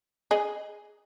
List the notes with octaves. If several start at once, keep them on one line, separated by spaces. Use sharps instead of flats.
G#4 D#5